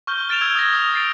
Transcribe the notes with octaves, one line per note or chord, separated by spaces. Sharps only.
C#6 F6 G6 G7
F6 A6 D7 E7 F7
E6 G#6
D#6 E6 G#6 A#6
D#6
A6 C7 D7